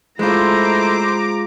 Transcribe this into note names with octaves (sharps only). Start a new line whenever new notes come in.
G#3 A3 E4 F4 C5 A#5 D6